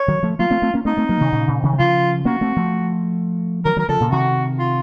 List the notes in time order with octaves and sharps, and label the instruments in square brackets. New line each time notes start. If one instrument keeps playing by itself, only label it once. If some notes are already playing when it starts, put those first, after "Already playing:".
Already playing: [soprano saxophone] C#5
[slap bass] D#3 F#3
F3 A3
[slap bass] F#3 A#3 [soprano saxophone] F4
[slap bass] A3 C4
A3 C4
A#3 C#4
[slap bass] A3 C4 [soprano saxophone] D#4
[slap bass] A3 C4
F#3 A#3
C3 D#3
A#2 C#3
A#2 C#3
C3 D#3
F#3
[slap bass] C#3 F3 [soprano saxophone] F4
[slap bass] A#3 C#4 [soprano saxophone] F#4
[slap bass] A3 C4
F3 A3
[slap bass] D#3 F#3 [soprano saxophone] A#4
[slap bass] D#3 F#3 [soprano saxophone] A#4
[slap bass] C#3 F3 [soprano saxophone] A4
[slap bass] A#2 C#3
[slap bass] C3 D#3 [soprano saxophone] F#4
[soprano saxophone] F4